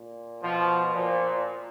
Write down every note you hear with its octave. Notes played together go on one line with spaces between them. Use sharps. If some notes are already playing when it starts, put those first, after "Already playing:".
Already playing: A#2
B2 F3
A#2 F3